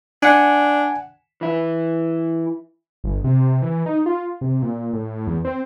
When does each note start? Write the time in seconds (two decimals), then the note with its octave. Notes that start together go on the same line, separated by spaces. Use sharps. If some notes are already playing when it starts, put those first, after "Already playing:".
0.23 D4 F#5 G#5
1.41 E3 E4
3.04 G1
3.24 C3
3.62 E3
3.86 D#4
4.06 F4
4.41 C3
4.62 A#2
4.93 A2
5.27 E2
5.45 C4